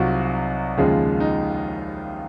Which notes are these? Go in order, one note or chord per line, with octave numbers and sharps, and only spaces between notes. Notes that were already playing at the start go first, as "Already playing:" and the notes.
Already playing: C2 C3 F#3 D#4 F4 F#4
D#2 C#3 F3 G#3
D#4